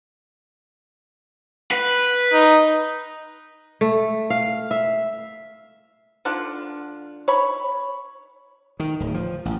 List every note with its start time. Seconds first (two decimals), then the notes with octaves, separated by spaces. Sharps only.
1.72 B4
2.33 D#4
3.81 A3
4.30 F5
4.71 E5
6.25 D3 D4 F4 F#5
7.28 C#5 B5
8.80 D#3
9.00 D1
9.14 F3
9.45 A1